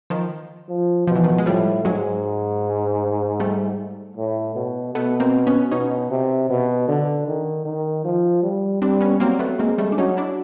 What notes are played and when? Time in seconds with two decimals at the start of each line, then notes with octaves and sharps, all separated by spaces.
0.10 D#3 F3
0.69 F3
1.07 B2 F3
1.15 E3
1.24 D#3 F3
1.38 G#3
1.46 A2 F3 G3
1.85 G#2 F#3 G#3
3.40 G3 A3
4.17 A2
4.56 B2
4.94 B2 A3 B3
5.20 A#3 C4
5.47 B3 C#4
5.72 B2 C#4 D#4
6.11 C3
6.50 B2
6.88 D3
7.28 D#3
7.65 D#3
8.05 F3
8.43 G3
8.82 G3 C4 D4
9.01 B3 C#4
9.20 F#3 A#3 C4
9.39 A3 B3
9.59 G#3 A#3 C4
9.78 G3 A3
9.92 D4
9.97 F#3 C#4 D#4
10.17 D4 E4